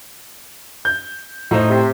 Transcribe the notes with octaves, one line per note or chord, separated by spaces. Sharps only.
G6
A2 D#4 C5
C3